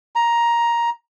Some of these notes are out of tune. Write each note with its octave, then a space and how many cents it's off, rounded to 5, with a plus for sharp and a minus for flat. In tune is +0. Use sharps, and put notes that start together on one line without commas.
A#5 +10